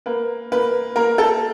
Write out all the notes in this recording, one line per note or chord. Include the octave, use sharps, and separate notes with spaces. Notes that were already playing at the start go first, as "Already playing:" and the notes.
A#3 B4
A#3 B4
A#3 A#4
A4